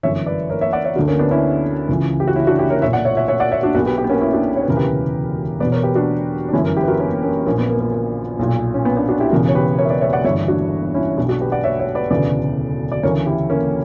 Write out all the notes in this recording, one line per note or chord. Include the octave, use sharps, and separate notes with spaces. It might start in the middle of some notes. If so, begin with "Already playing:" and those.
G1 F#2 E3 C#5 E5
B4 D5
A#4 C#5
C#5 E5
D5 F#5
C#5 E5
D2 D3 F#4 A#4
A#3 C#4
B3 D4
C#4 E4
C#2 C#3 E3
G4
F#4
C#4 E4
D4 F#4
E4 G4
A#4 C#5
B1 A#2 C#5 E5
D5 F#5
C#5 E5
C#5 E5
C#5 E5
D5 F#5
C#5 E5
D4 F#4
B1 B2 F#4 A#4
G4 B4
G4 B4
B3
A#3 C#4
C#4 E4
D4 F#4
C#5
B4
E1 D2 C#3 E3 A#4
G4 B4
E1 E2 B2 B4 D5
A#4 C#5
G4 B4
D4 F#4
D4
G1 F#2 E3 C#4 E4
A#4
E4 G4
B4
F#4 A#4
A#3 C#4
A#3 C#4
A#1 A#2 A#3 C#4
B3
A#3
A#3
A#3
B1 A#2
C#4
B3
B3 D4
D4 F#4
E4 G4
E1 E2 C#3 E3 F#4 A#4
C#5
G4 B4
A#4 C#5
E5
B4 D5
C#5 E5
D5 F#5
G1 G2 E3 C#5 E5
D4 F#4
C#4 E4
B1 B2 D4 F#4
D4 F#4
G4 B4
D5 F#5
C#5 E5
C#5 E5
B4 D5
E1 D2 C#3 E3 B4 D5
D5
D2 C#3 E3 A#4 C#5
E4 G4
A#3 C#4